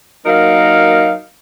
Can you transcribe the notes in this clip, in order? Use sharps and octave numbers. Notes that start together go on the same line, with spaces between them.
F#3 A#3 D#4 A#4 F5